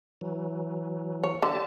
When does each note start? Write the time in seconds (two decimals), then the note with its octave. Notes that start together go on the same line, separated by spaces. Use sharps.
0.21 E3 F#3
1.24 C#5
1.42 D3 G4 A5